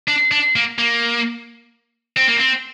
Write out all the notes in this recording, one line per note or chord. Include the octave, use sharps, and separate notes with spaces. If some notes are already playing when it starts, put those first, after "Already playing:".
D4
D4
A#3
A#3
C4
A#3
C4